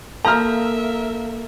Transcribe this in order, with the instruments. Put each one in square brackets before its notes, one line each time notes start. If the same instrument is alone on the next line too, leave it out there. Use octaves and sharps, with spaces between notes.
[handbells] A#3 A4 [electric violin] A#4 E5 [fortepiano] A#5 F6